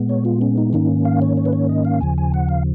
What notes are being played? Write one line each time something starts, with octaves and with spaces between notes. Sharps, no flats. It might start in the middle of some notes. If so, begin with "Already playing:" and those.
Already playing: A#2 G#3 B3
C#5
F4
C#4
D#4
G#2 D#3 A#3 C#4 D#4
F5
C#5
C#5
B4
C#5
D#5
F5
D#2 C#3 F3 G#5
G#5
F#5
F5